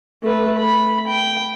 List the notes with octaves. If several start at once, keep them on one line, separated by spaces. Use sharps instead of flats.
A3 B4
B5
G5